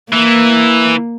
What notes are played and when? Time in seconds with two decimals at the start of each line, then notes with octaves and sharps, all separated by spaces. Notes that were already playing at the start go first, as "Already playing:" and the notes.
0.13 E3 A#3